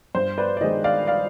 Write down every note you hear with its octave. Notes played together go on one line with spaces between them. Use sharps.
G2 C5
B4 D5
D5
D#3 G#3 C5 D#5
D5 F5
D5 F5